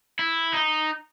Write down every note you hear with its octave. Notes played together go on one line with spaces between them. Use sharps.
E4
D#4